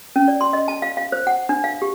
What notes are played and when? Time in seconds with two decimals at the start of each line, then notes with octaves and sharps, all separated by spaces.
0.16 C#4
0.28 D5
0.41 C6
0.53 D#5
0.68 A5
0.82 F5
0.97 F5
1.12 C5
1.27 F#5
1.49 D4
1.64 F5
1.82 G4